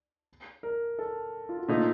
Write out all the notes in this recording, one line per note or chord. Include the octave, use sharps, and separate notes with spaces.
A#4
A4
F4
F#4
A#2 F3 A3 D#4 A4